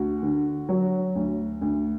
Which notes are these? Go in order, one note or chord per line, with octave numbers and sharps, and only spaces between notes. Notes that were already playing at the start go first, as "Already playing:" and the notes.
Already playing: D2 F#4
D3
F#3
D2
D2